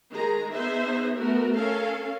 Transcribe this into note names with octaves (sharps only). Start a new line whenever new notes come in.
D#3 G#3 G#4 A#5
B3 D#4 G#4 C5 E5
A3 B3 F#4 A#4
C#4 A4 A#4 F5